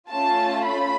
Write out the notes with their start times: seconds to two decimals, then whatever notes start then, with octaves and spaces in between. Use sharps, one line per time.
0.10 A3 C#4 F4 A5
0.66 B5